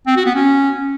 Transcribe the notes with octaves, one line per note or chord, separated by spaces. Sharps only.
C4
F#4
B3
C#4